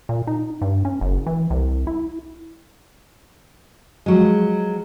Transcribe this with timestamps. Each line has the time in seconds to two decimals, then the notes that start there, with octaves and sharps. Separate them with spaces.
0.09 A#2
0.27 D#4
0.62 G2
0.85 C#4
1.01 F#1
1.26 E3
1.50 C2
1.87 E4
4.06 F3 F#3 G#3